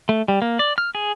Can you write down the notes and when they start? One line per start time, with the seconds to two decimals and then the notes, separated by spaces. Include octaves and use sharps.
0.09 A3
0.28 G3
0.42 A#3
0.59 D5
0.78 F6
0.95 G#4